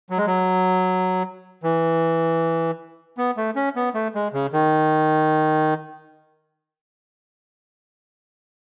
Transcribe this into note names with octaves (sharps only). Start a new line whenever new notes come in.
F#3
G#3
F#3
E3
B3
A3
C#4
B3
A3
G#3
C#3
D#3